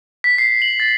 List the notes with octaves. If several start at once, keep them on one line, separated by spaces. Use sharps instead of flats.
B6
C7
F#7
A6